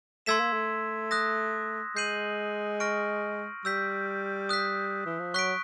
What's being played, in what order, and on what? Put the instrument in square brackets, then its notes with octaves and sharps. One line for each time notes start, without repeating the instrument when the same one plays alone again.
[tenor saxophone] A3 [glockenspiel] C6 E6 G#6 B6 E7
[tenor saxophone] A#3
A3
[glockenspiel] D#6 F#6 A#6
[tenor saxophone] G#3 [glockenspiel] G6 C7 D#7 F#7
[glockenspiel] C#6 F6 A#6 D7
[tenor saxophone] G3 [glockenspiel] E6 G6 B6
[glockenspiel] D#6 F#6 B6
[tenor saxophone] E3
F3
[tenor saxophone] F#3 [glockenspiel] C#6 F#6 B6 D7